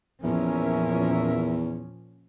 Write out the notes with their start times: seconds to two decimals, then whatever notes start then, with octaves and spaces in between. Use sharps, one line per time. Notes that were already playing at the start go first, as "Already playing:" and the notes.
0.24 E2 A#2 F3 C#4 A#4 E5